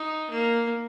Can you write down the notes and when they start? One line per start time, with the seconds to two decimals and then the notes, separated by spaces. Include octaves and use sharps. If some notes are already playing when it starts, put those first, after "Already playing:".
Already playing: D#4
0.30 A#3